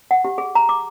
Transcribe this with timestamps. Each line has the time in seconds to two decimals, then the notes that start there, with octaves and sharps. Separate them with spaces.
0.11 F#5
0.25 G4
0.38 G#4
0.55 A#5
0.69 D6